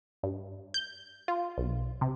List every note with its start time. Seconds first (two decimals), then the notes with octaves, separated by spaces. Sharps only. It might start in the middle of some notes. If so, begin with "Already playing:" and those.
0.23 G2
0.74 G6
1.28 F4
1.58 B1
2.01 C3